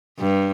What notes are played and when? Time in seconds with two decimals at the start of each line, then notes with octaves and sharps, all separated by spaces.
0.19 G2